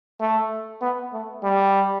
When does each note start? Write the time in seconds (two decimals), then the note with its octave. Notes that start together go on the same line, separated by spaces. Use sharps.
0.20 A3
0.81 B3
1.13 A3
1.44 G3